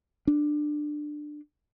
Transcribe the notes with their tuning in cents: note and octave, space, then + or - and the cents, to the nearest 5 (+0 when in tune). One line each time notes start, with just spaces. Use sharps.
D4 +20